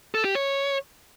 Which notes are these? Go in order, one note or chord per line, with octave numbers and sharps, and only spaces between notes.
A4
G4
C#5